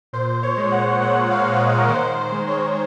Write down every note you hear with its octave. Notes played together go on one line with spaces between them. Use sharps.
A#2 C5
C#5
G#3
F#5
A#2 F#5
F5
G#3
F5
D#5
A#4
D#3 C5
C5
G#3
C#5